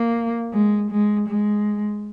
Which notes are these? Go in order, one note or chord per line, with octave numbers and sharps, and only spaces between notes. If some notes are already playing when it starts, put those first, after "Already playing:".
Already playing: A#3
G#3
G#3
G#3